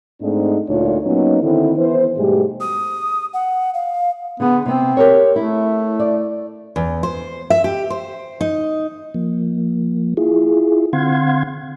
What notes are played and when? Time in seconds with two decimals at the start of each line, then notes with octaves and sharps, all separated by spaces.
0.21 G#2 A3 C4 D4 D#4
0.69 D2 A#2 D4 D#4 F4 C#5
1.04 F#3 A#3 B3 C#4 D#4
1.42 D3 D#3 C4 E4
1.77 E3 B3 E4 C5
2.17 G#2 B2 G3 A3 G4 G#4
2.60 D#6
3.34 F#5
3.74 F5
4.40 D3 B3 G#4
4.66 C3 B3 C4
4.97 G4 A#4 C#5
5.36 A3 E4
6.00 D5
6.76 E2
7.03 C5
7.50 E5
7.64 G4
7.90 C5
8.41 D#4
9.14 F3 A#3
10.17 E4 F4 G#4
10.93 D3 C4 F5 F#5 C6 G#6